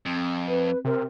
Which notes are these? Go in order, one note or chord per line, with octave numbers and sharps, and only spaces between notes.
F2 C4
B4
C3 A#4